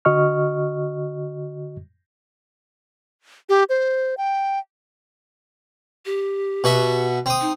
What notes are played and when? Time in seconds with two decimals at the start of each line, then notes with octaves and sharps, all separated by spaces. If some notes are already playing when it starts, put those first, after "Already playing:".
0.05 D3 F#4 D#5 C#6 F6
3.49 G4
3.69 C5
4.18 G5
6.06 G4
6.64 B2 F#4 E5
7.26 C4 D#6
7.41 D#4